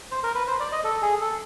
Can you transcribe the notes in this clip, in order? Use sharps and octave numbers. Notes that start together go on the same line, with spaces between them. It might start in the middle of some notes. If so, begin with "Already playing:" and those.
C5
A#4
B4
C5
D5
D#5
A4
G#4
A4